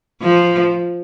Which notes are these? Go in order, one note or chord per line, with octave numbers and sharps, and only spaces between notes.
F3